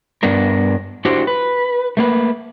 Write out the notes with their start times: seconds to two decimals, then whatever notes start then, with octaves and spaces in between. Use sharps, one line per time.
0.23 G2 B3 D4 A#4
1.05 D4 E4 F#4 G4 A4 C5
1.27 B4
1.97 A3 A#3 B4